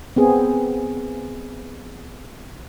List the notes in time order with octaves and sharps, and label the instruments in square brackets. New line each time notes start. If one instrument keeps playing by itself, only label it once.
[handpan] B3 C4 G#4